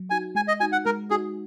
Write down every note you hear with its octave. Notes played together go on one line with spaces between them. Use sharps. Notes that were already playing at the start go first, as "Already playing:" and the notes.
Already playing: F#3
D#4 F#4 G#5
G#3 G#5
D#5
D#4 F#4 G#5
F#5
G#3 A#4
D#4 F#4 G#4